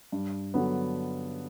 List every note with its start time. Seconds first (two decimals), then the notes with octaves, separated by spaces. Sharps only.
0.12 G2
0.54 D3 F#3 B3